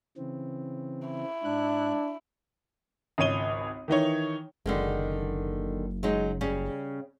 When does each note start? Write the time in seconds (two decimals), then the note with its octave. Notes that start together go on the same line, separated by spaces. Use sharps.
0.17 C#3 E3 C4
1.08 E4
1.44 G#2 D4 F#6
3.18 G#1 C#2 C#5 D#7 G7
3.88 D#3 E3 D#4 C#5
4.66 F#1 D3 D#3 G#3
6.03 F#3 G#3 D#4
6.41 C#3 G3 C#4